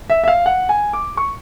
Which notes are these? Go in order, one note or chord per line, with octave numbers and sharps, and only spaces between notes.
E5
E5
F5
F#5
G#5
D6
C#6